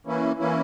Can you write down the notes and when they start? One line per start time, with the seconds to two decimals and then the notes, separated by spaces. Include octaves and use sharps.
0.06 E3 A#3 C#4 E4
0.39 E3 A#3 C#4 E4